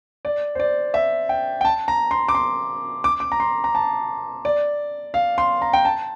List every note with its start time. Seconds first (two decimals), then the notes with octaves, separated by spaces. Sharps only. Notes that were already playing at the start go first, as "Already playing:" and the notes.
0.25 D5
0.55 C5
0.60 D5
0.94 E5
1.29 G5
1.61 G5
1.65 A5
1.88 A#5
2.11 C6
2.29 D6
2.35 C6
3.04 D6
3.20 D6
3.32 A#5
3.40 C6
3.64 A#5
3.75 A5
4.45 D5
5.14 F5
5.38 C6
5.62 A#5
5.73 G5
5.85 A5